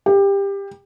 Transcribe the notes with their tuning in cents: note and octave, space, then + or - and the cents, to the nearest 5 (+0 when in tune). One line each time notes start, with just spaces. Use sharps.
G4 +20